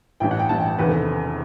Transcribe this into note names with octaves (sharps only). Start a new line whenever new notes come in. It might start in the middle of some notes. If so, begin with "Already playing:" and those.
A1 G2 E3 G5
F#5
G5
A1 G2 E3 A5
G5
E1 E2 C3 D#3 B4
A4